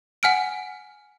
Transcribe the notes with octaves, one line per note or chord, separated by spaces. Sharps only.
F#5 G#5 F6 D7